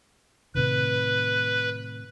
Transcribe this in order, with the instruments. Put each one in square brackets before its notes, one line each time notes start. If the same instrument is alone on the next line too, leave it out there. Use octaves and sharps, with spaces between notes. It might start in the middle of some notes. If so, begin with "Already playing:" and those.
[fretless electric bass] A2 C3 D#3 [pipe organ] B4